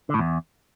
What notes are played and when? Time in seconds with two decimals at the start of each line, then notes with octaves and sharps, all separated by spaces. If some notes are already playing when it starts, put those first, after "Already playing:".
0.09 D3
0.14 A2
0.19 E2